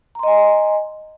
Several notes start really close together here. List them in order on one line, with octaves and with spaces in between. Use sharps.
A#5 C6 D#5 G#5